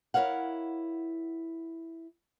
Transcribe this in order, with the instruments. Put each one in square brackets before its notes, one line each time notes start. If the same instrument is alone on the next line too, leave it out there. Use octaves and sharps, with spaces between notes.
[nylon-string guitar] E4 A#4 C#5 F5 F#5